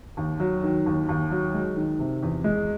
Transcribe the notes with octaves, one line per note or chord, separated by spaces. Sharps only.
D#2
F#3
D#3
D#2
D#2
F#3
G#3
D#3
C3
E2
G#3